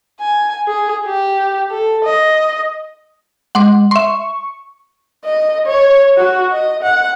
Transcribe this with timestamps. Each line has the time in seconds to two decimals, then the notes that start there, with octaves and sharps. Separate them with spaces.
0.21 G#5
0.68 G#4
1.06 G4
1.71 A4
2.05 D#5
3.55 G#3 F#5 C6 D6
3.91 E5 C6 C#6
5.25 D#5
5.67 C#5
6.17 F#4
6.53 D#5
6.83 F#5